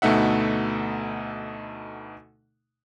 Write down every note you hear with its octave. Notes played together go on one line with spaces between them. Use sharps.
D2 B2 A3 D#4 E5 F#5